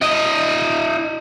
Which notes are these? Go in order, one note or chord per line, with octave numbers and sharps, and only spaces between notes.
E4 D#5